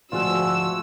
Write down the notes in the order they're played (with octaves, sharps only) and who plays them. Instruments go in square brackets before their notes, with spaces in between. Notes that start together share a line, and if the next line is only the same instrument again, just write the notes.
[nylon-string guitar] D2 G#2 F3 [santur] F4 G#4 F#5 [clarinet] F#4 [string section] E6